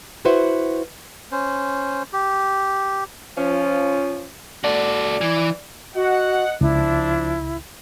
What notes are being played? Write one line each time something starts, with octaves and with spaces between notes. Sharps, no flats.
E4 F#4 B4 C5 E5 F#5
C#4 C5
G4
F3 C#4
F#4 A4 D5
E3
F#4 D#5 F#5
C#2 F3 D4 E4